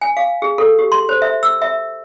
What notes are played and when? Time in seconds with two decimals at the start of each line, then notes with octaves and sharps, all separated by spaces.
0.01 G#5
0.17 F5
0.42 G#4
0.58 A4
0.79 G4
0.92 C6
1.09 C5
1.22 E5
1.43 E6
1.62 E5